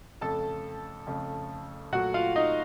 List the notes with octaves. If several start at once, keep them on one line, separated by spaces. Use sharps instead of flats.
F2 C#3 A3 A4 A5
F2 C#3 A3
A#2 F#3 A3 F#4 F#5
F4 F5
D#4 D#5